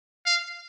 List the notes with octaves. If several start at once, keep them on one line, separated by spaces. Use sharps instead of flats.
F5